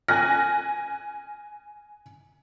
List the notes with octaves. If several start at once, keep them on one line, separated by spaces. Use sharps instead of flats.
G#5 F6 F#6 A#6